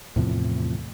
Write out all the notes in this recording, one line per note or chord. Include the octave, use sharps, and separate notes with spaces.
E2 A2 C3 F3